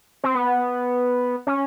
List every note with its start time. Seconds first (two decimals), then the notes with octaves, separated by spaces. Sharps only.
0.24 C4
0.35 B3
1.47 C#4